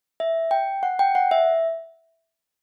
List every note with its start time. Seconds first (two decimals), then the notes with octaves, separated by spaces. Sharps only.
0.20 E5
0.51 G5
0.83 F#5
0.99 G5
1.15 F#5
1.31 E5